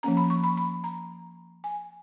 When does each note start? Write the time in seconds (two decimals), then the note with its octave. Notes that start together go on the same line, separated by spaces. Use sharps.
0.03 F3 A#3 C#4 A#5
0.17 B5
0.30 C#6
0.44 B5
0.57 B5
0.84 A#5
1.64 G#5